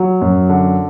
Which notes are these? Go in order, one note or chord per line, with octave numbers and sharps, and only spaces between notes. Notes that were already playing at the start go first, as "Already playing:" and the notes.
Already playing: F#3
F#2
D3